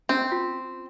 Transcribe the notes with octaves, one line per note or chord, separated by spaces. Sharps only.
C4 C#4
F4